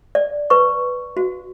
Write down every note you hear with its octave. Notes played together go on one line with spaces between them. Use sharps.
D5
B4 C#6
F#4